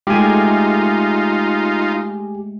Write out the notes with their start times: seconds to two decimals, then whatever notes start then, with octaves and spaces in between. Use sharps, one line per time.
0.07 G#3 A3 D#4 F4 G4 G#5